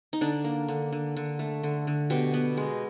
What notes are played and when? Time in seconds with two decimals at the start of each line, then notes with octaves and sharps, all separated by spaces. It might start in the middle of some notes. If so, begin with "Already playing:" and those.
0.13 D#4
0.21 D3 D4
0.44 A#3
0.68 D3
0.92 D3
1.17 D3
1.39 A3
1.63 D3
1.87 D3
2.10 B2 G4
2.34 B3
2.57 G#3